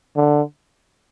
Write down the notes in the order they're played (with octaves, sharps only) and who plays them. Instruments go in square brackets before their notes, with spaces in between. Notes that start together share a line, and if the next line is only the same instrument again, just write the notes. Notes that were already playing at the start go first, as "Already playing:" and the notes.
[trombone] D3